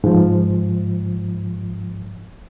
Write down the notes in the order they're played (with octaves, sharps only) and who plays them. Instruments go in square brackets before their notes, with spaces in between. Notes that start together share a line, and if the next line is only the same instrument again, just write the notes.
[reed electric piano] G#2 F3